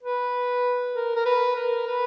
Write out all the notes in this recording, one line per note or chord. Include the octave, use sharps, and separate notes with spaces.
B4
A#4
A#4
B4
A#4
B4